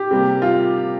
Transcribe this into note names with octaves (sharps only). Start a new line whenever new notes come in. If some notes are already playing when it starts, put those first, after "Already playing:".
Already playing: G4
C3 G3 A#3
F4